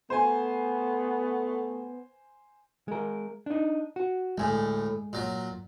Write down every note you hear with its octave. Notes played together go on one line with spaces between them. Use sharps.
A3 B3 C5 G#5
G#3 A#4
D4 D#4
F#4
D2 A2 G#3 G#5
A#2 F#3